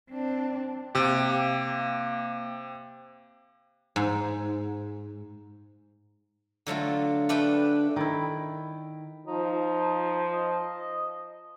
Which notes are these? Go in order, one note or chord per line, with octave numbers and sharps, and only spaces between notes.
C4 D4
C3 A#3 G4
G#2
D3 F#3 A3 F4
A3 D4 B4 G5
D#3 E4
F3 D#4
D#5